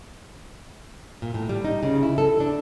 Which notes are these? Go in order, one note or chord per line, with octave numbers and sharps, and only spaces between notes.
A#2
A2
G3
D#4
C#3
E4
A4
D4